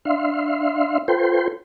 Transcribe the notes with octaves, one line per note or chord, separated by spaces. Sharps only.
D4 E5 F5 C6
F4 A4 B4 C5 G5 C6